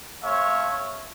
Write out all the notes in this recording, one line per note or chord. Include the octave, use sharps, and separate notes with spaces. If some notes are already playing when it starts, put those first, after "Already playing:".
A3 C4 C#5 E5 F5